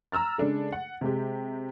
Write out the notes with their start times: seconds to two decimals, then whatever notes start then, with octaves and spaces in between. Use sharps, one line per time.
0.12 A#5 E6 F6 A6
0.38 C#3 G#3 D4 A4
0.72 F#5
1.01 C3 G#3 G4